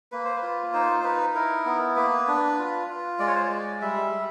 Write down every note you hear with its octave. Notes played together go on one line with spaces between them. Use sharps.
A#3 B4
C5
B4
F4
D#4 C5
C5
D#4 B4
E4 A#4
B3
A#3 B4
D4
F4
F4
G#3 D5
C#5
C5
C#5
G#3 D5
G3 E5
G3